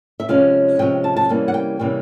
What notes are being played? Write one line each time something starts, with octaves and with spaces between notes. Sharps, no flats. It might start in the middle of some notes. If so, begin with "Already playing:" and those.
E5
C3 F3 G#3 C#4 F5
C3 F3 G#3 C#4 G5
A5
A5
C3 E3 G3 A#3 C#4
F#5
G5
C3 E3 G3 A#3 C#4